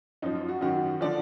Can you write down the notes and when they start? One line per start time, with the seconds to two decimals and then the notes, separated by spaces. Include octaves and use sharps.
0.22 F#2 F3 D#4
0.35 F4
0.48 F#4
0.61 F#2 D#3 F#3 F#4
1.01 D3 F3 D5